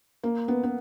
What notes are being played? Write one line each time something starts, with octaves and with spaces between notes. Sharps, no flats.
A#3
B3
B3